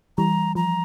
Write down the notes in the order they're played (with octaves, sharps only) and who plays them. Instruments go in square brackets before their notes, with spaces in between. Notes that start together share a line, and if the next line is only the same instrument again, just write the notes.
[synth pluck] E3 G3 [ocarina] A#5
[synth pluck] F3 [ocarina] A#5